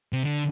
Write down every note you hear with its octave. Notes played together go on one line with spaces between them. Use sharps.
C3
D3